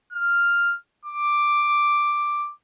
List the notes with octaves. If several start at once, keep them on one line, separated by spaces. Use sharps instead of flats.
F6
D6